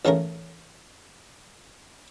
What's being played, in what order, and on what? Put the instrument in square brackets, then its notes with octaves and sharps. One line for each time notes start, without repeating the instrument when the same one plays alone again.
[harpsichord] A1 C#3 A3 C#4 A#4